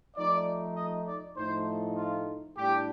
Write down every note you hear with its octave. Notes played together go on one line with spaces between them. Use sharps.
F3 A3 D#4 D5
D#5
D5
A2 F3 A3 D#4 C5
F4
A2 G3 D4 G4